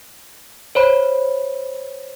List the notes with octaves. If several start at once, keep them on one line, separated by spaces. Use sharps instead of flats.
C5 C#5 B5